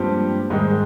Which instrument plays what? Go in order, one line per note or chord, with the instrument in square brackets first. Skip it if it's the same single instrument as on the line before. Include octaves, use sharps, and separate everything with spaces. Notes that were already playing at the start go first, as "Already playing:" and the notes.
Already playing: [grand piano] G2 F3 C4 G4 [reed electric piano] G#3 A#3
[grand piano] G#2 D#3 G#3 [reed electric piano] G3